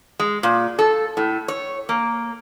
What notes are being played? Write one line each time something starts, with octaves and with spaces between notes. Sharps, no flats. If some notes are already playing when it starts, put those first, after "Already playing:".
G#3
A#2
A4
A2
C#5
A#3